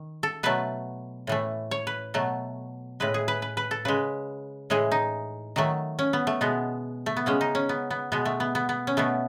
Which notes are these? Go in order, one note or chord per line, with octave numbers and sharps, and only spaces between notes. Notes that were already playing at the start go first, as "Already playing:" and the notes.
Already playing: D#3
A4
B2 F#3 A3 B4
A2 E3 A3
C#5
B4
B2 F#3 A3
A2 G#3 B4
G#4
B4
B4
B4
A4
C#3 G#3 B4
A2 E3 G#3 G#4
D#4
D#3 F#3 A3
C#4
B3
A3
B2 G#3 B3
A3
B3
C#3 G#3 C#4
D#4
C#4
B3
B3
B2 G#3 B3
A3
B3
B3
B3
C#4
B2 A3 B3